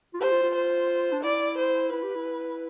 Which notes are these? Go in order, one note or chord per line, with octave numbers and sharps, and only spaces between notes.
F4
G4 C5
F4
F4
C5
D4
E4 D5
C5
E4 B4
G4
E4